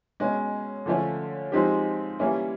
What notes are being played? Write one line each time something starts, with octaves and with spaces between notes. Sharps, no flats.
B2 G#3 C#4
D3 F3 A3 C#4
F3 G#3 C4 D#4 G4
E3 G3 A#3 C#4 E4